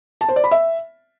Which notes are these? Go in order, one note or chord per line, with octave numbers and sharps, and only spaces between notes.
A5
C5
D5
B5
E5